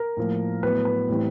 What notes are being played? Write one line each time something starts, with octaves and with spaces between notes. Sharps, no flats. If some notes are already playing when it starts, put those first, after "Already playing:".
Already playing: A#4
A2 F3 A#3
A2 F#3 B3 B4
B4
A2 E3 G3 C4